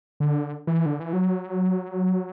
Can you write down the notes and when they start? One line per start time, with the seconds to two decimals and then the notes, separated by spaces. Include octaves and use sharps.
0.20 D3
0.67 E3
0.86 D3
1.00 E3
1.13 F#3